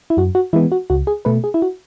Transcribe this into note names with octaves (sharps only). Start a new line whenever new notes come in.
E4
F#2 F#4
F#4
E3 G#3 B3 E4
F#4
C#2 F#4
G#4
B2 A3 B4
G#4
E4
F#4